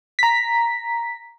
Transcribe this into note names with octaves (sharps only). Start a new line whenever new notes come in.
A#5 B6